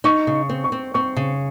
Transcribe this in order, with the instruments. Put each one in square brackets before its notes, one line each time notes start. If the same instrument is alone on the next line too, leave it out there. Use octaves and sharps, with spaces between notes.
[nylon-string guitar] D#4 [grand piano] C#6
[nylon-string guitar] C#3
C4
[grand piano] C#6
[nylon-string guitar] C4
[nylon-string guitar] C4 [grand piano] C#6
[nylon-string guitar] C#3